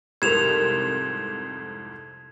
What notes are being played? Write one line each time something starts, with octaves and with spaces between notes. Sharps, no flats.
C2 F2 G#2 G4 A#4 G#6 E7 F7